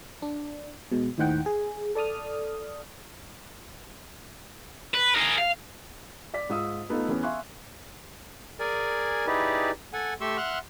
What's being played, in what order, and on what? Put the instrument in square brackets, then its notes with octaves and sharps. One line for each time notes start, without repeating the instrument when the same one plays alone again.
[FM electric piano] D4
B2 G#3
D#2 A2 D#4 C5 F#5 G5
G#4
A4 D5 A5 D#6 F6
[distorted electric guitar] B4
G#4 A#4
F5
[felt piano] D5 B6
G#2 F4 D#6 E6
A3 B3 D#4 F4 A4
E2 E3 B3 C#4
E5 F5 G#5 C6 C#6 F#6
[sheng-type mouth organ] G#4 A#4 D5 G#5
D#4 E4 G4 G#4 B4 D5
A4 F#5 G#5
A3 G4 C6 C#6 E6
E5 F#5 C6 F6 F#6